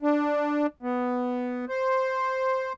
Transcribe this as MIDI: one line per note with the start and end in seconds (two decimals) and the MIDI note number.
0.02 0.67 62
0.83 1.65 59
1.69 2.73 72